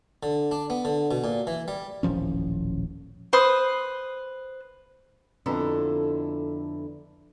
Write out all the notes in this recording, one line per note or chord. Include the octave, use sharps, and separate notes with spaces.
D3
D4
B3
D3
B2
A#2
E3
G3
D#1 A1 F3 C#4
B4 C5 D#6
F2 D3 B3 E4 A4 A#5